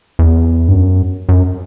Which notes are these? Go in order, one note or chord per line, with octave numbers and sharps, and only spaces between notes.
E2
G2
F#2
F#2